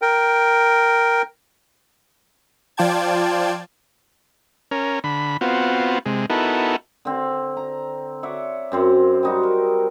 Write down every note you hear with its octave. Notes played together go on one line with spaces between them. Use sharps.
A#4 G5
F3 F4 D5 G5 A5 G#6
C#4 A#4
D3 B5
B3 C4 F4 F#4
C3 G#3
B3 D#4 E4 F#4 A4 A#4
D3 C4
A#5
C#5 D5 E5 F#5
F#2 C4 C5
G3 D#4 F#4
A#4